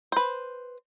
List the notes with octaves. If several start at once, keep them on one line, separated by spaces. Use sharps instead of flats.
B4 C5